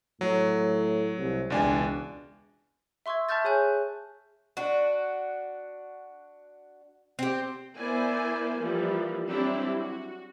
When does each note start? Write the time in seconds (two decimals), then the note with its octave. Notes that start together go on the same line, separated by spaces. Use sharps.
0.21 A2 F#3
1.17 C2
1.50 E1 C#2 D4 G#5
3.06 E5 C6 C#6 E6 G#6
3.29 E5 A5 C#6 F6 G6 A6
3.44 G#4 C#5 G#5 F#6 G6
4.57 D4 F#4
7.19 C4 G4
7.78 B3 E4 A#4 C5 D5 G#5
8.58 E3 F3 G3 A#3
9.28 F#3 G3 C4 D4 E4 G4
9.76 F#4